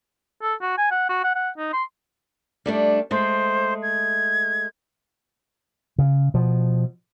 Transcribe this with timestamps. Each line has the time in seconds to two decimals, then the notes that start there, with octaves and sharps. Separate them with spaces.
0.42 A4
0.61 F#4
0.78 G#5
0.91 F#5
1.09 F#4
1.24 F#5
1.36 F#5
1.58 D#4
1.73 C6
2.66 G3 A3 D4
3.11 G#3 A3 C5
3.82 G#6
5.98 C#3
6.34 B2 F3